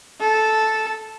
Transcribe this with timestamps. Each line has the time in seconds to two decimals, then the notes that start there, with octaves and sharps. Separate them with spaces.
0.20 A4